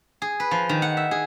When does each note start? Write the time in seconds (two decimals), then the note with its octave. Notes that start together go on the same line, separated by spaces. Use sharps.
0.22 G#4
0.40 B4
0.51 F3
0.69 D#3
0.82 F#5
0.97 E5
1.11 G#4